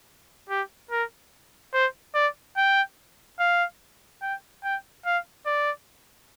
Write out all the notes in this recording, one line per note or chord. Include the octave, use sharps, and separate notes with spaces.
G4
A#4
C5
D5
G5
F5
G5
G5
F5
D5